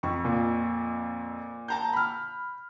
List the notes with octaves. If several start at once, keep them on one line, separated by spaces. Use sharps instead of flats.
F2 C#6
A#2
A5 A#5 G6
B5 F6